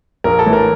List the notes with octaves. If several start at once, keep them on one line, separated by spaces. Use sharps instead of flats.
A#1 A#4
A4
A2 E3
A#4